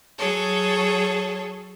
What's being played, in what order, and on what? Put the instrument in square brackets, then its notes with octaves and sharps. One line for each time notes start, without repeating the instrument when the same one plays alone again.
[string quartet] F#3 G#4 A4 C#5